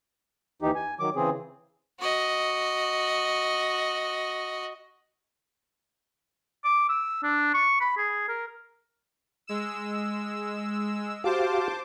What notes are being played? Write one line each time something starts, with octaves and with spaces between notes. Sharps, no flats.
D#2 E3 D#4 G4
G#5
D#3 F#3 D6
C#3 E3 C4 G#4
F#4 D#5
D6
E6
D4
C#6
B5
G#4
A#4
G#3 E6
F#4 G4 C5 F5 A5 D6